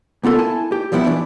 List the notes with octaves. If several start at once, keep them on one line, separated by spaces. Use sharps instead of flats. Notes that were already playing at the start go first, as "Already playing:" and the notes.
C2 B3 F4 A4 A#4
E4 G#5 A5
G4
A#2 F3 G3 B3 E4
E2 E3 D4